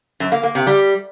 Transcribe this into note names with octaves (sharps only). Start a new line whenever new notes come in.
F#2
A#3
A#3
C3
G3